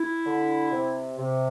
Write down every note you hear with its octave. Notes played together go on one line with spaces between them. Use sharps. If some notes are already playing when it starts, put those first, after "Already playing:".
Already playing: E4
D3
C3
C3